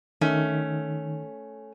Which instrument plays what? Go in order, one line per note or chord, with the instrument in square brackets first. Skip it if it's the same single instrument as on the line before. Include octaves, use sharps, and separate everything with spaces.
[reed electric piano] D#3 [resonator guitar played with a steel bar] A3 C#4